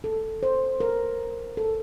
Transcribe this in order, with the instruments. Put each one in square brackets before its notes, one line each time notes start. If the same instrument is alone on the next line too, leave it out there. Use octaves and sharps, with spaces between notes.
[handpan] A4
C5
A#4
A4